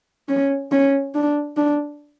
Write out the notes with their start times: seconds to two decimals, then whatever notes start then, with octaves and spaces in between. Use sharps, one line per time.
0.29 C#4
0.71 C#4
1.15 D4
1.57 D4